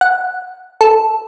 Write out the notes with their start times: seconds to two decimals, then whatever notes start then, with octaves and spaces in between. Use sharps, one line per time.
0.01 F#5
0.81 A4